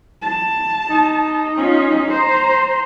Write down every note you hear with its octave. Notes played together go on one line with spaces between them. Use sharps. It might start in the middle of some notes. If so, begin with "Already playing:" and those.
A5
D#4
C#4 F4
C5 A#5